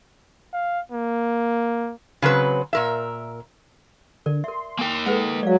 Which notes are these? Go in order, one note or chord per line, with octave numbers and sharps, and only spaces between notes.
F5
A#3
C#3 F#3 C4 B4
A#2 A#4 E5
D3 A#4 D5
A#4 E5 C6
A#3 A#4 G5 G#5
G#3 A4 B4 F#5
F#3 D5 F5